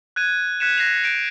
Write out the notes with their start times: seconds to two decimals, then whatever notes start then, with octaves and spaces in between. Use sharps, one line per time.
0.16 F#6 G#6 D#7
0.60 F#6 G#6 B6 C#7 D#7 E7
0.78 G#6 A#6 C7 F7
1.04 G6 D7 F7